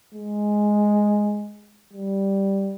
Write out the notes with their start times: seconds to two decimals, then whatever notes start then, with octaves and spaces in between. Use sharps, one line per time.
0.14 G#3
1.94 G3